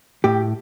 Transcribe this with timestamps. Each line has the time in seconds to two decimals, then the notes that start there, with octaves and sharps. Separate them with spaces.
0.24 A2 G4